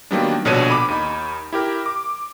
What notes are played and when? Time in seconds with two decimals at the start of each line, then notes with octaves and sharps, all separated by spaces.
0.11 D#3 F#3 G3 A#3 B3 D4
0.45 A#1 B2 D3 C#5 A5 D#7
0.70 B5 D6
0.88 D#2 D#4 B5
1.53 E4 G4 A#4
1.86 D6